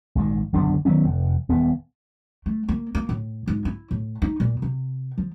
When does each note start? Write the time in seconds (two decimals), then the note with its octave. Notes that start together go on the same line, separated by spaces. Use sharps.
0.15 A#1 G#2 D#3
0.53 F#1 B1 D3 D4
0.85 D#3 F#3 B3 C#4
1.04 F1
1.49 D#1 B3
2.46 A3
2.69 A#3
2.95 A#3
3.09 A2
3.47 G#2
3.65 E4
3.91 A2
4.22 D#4
4.40 A#2
4.62 C3
5.18 F3